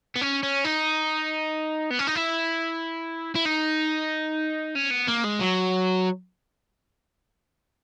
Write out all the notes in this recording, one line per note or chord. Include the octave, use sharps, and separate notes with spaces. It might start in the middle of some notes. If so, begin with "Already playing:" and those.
B3
C#4
C#4
D#4
B3
C#4
D#4
E4
E4
D#4
C#4
B3
A#3
G#3
F#3